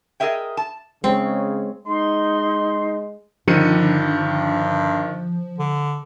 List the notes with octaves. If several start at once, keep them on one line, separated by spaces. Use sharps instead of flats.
G#4 A#4 D#5 E5 G5
A5
C#3 G#3 C4 G#4 C#5
G#3 D#4 C6
G2 D3 D#3 F3 C#7 D#7
D3